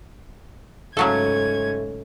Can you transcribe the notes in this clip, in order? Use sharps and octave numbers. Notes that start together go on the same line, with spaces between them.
G#2 C#3 F#3 A3 C#4 A4 G#6